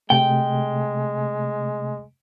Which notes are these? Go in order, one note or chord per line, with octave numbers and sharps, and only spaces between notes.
C3 G#3 A3 G5